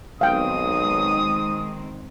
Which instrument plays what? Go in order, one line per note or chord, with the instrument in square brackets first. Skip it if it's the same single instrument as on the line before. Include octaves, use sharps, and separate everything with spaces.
[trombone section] B1 [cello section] D#3 G#3 C4 [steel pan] F5 G5 [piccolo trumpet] D#6